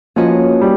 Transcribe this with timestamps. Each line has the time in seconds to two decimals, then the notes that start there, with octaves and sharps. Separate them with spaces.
0.16 F3 A#3 C#4 F#4 B4 D#5
0.61 G3